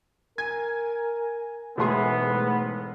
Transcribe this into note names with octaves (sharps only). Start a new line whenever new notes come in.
A#4 G#5 G#6
E1 G#2 B2 A3 B3 G#4 C6